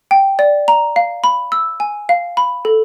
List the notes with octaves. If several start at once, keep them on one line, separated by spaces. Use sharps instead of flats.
G5
D5
A#5
F5
B5
E6
G#5
F5
B5
A4